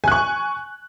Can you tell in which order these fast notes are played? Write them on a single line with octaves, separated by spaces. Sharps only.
G#5 F#6 C#6